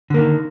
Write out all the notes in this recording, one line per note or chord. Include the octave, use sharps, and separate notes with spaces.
D3 D#3 A#3